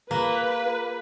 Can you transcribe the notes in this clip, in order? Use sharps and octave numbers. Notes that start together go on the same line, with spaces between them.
A#3 F4 G#4 A#4 B4